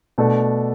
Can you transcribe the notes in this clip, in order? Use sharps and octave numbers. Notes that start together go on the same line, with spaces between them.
B2 A3 D4 A4